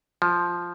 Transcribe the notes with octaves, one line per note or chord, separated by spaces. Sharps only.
F3